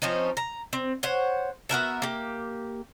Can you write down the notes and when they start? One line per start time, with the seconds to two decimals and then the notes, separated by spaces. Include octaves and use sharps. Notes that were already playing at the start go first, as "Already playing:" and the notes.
0.02 F3 C4 C#4 D#4
0.37 A#5
0.73 C4
1.03 C5 C#5 F#5
1.69 B3 F#4 A#4 E5
2.02 A#3 G4